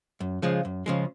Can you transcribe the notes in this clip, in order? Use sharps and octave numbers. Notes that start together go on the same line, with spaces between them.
F#2
C#3 F3 G#3
F#2
C#3 F3 G#3